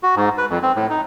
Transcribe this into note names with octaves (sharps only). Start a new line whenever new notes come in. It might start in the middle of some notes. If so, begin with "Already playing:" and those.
F#4
G#2
B4
F2
C4
A2
D#4